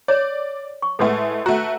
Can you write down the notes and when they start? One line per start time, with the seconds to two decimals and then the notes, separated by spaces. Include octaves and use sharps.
0.08 C#5 D5
0.82 C#6
0.99 A2 G#3 A3 A4 B4 F#5
1.46 A3 F#4 A#5